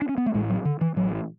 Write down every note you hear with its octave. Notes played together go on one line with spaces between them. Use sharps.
D4
C#4
B3
A3
A1 A2 G#3
F#3
D3
E3
A1 A2 F#3